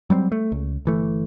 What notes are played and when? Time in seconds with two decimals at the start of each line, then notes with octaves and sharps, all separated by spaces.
0.10 F#3 G3 B3 C4
0.32 A3
0.52 C#2
0.85 G1 E3 A3